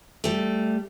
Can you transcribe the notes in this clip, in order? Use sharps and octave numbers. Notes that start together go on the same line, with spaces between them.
G3 A3